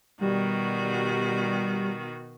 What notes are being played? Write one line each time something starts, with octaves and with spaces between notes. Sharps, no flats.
B2 D#3 G3 F#4